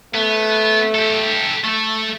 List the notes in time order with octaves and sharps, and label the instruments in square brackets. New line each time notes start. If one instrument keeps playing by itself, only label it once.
[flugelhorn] A3 [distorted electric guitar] B3
[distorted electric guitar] G4 A4
A3 A4